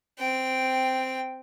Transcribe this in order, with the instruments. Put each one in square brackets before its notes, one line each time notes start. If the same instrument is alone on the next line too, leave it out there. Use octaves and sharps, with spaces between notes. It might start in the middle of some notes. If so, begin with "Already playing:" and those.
[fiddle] C4 G5